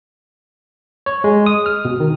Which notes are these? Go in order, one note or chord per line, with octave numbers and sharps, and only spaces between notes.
C#5
G#3
D#6
F6
B2
D#3